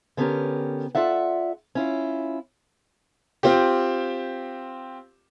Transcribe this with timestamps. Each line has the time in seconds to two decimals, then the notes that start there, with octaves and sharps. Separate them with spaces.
0.17 D3 B3 C#4 G4 A#4
0.95 F4 A4 D5 E5 F#5
1.75 C#4 E4 F4
3.43 C4 F4 G4